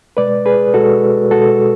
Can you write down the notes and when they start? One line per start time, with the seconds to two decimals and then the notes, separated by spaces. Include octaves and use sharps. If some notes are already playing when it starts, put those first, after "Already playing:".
0.17 B2 G#3 B4 D5
0.46 G#4 B4
0.74 B2 G#3 F#4 A4
1.31 B2 G#3 F#4 A4